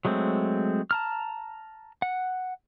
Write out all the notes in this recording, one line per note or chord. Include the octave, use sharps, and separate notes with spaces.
F#3 G#3 A3 C4
A5 A#5 F6
F#5